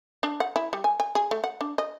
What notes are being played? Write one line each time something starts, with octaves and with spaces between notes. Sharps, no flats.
D4
F#5
E4
G3
G#5
G#5
G#4
A3
F#5
D4
D#5